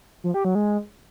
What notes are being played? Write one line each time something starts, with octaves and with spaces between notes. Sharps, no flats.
F3
G4
F#3
G#3